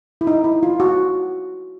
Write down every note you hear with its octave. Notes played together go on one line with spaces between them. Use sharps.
E4
D#4
E4
F4
F#4